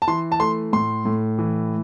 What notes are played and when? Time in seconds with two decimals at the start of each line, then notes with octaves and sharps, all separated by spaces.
0.02 A5
0.08 E3 C6
0.32 A5
0.40 A3 C6
0.73 A2 C6
1.05 A2
1.38 E3